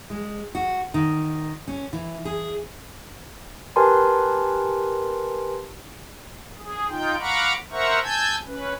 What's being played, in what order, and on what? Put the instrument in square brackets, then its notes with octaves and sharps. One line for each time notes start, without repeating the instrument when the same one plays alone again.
[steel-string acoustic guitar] G#3
F#4
D#3
C#4
E3
G#4
[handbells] G4 A#4 B4 G#5 A5 C6
[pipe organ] G#4
D#4 F4 G5
F5 F#5 A#5 B5 C#6 D6
A#4 C5 E5 F#5 A#5 C#6
G#5 A5 E6 G6 G#6
C#4 B4